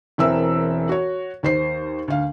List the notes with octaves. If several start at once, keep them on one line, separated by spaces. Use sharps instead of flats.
E1 E3 C4 A#4 E5 E6
F#4 C#5
D#2 C5 C7
D2 F5